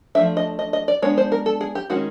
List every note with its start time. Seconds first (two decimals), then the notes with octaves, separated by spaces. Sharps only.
0.15 F3 A3 D4 E5
0.37 D#5
0.59 D#5
0.73 D#5
0.88 D5
1.02 G#3 B3 D4 C#5
1.18 C5
1.32 A#4
1.46 A4
1.61 G#4
1.75 G4
1.90 D#3 G#3 C#4 F#4